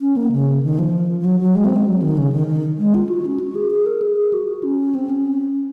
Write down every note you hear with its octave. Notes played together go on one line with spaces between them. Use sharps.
C#4
A#3
C#3
D#3
F3
F3
F#3
F#3
G#3
C4
G#3
F#3
D#3
C#3
D#3
D#3
G#3
F4
F#4
C#4
F#4
G#4
G#4
A#4
G#4
G#4
F#4
F#4
C#4
C4
C#4